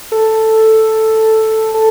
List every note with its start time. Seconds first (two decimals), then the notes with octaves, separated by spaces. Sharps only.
0.12 A4
1.74 A4